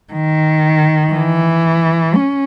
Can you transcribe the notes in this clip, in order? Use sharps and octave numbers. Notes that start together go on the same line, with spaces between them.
D#3
E3
C#4